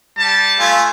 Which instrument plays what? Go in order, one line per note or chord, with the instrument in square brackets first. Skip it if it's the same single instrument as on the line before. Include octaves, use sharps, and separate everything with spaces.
[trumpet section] G3 A5
[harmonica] A3 F4 G#5